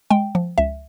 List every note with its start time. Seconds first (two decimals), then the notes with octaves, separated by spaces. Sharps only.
0.10 G#3 G5
0.35 F3
0.58 C#2 E5